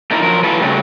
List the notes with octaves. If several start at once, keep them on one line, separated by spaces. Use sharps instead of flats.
A3 A#3 D#4 E4 A#4
F3 F#3 A#4
E3 F#3 F4 A4 B4
C#3 F#3 G3 A3